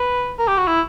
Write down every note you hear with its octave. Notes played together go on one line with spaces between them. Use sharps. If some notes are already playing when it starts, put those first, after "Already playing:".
Already playing: B4
A#4
G4
F#4
E4